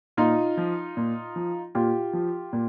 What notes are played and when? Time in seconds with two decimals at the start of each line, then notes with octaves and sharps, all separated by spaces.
0.17 A#2 D#4 F4
0.57 F3
0.97 A#2
1.36 F3
1.75 A#2 F4 G4
2.13 F3
2.53 A#2